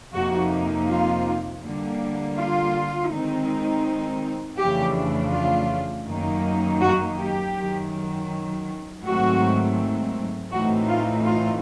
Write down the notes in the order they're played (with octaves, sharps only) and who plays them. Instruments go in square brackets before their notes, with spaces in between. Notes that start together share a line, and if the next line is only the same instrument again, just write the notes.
[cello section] F2 C3 F3 A#3 D#4 F#4
F4
D3 G3 A#3
F4
D#3 G#3 C4 D#4
F2 C#3 E3 A3 D4 G4
F4
F#2 D#3 F#3 A#3 D#4
F#4
G4
F#2 D#3 F#3
G#2 D#3 F#3 A3 C4 F#4
A2 E3 A3 C4 D#4 F#4
F4
F4